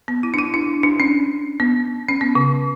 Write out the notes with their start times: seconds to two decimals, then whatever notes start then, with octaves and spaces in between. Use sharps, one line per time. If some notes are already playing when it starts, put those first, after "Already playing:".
0.08 B3
0.23 E4
0.34 D4
0.39 E4
0.54 D4
0.83 D4
1.00 C#4
1.60 B3
2.09 C#4
2.21 B3
2.35 C#3